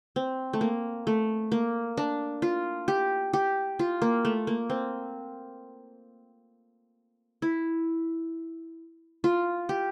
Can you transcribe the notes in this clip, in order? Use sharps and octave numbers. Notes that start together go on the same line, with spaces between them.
C4
A3
A#3
A3
A#3
D4
F4
G4
G4
F4
A#3
A3
A#3
C4
E4
F4
G4